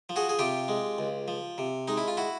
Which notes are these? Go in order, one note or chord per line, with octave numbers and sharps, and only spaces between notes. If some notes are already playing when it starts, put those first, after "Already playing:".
F3
F#4 G#4
G#4
C3 F4 G4
G#3
C#2
F3
C3
G#3 D#4
E4
F4
E4 F#4